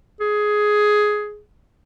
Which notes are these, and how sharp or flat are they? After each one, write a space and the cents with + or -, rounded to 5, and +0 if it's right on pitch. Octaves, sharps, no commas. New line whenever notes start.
G#4 +10